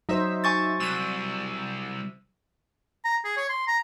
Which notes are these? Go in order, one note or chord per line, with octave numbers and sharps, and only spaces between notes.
F#3 D#4 C5 E5
G#5 C#6 A6
C2 E6 D#7
A#5
G#4
C#5
C6
A#5